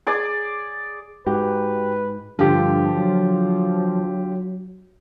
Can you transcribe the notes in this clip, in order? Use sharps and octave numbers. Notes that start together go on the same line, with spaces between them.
G#4 D5
G#2 F#4 G4 B4
G2 D3 F3 F4 G4
F#3